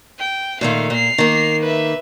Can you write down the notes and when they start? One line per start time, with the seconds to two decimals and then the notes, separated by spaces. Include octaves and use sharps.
0.19 G5
0.61 A#2 D#3 A3 F5
0.90 A#2 C7 F7
1.18 D#3 A#3
1.62 B4 E5